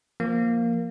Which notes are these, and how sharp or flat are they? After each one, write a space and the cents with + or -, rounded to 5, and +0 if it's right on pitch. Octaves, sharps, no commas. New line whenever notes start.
F3 +0 A#3 +0